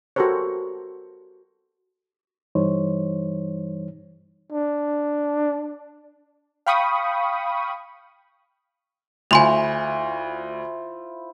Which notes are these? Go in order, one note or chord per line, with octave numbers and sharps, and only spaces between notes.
F#4 G4 A4 A#4 C5 C#5
G2 E3 G3 D#4 C5 C#5
D4
F5 G5 B5 C#6 D#6
D2 E4 F4 C5 G#5 C6 F7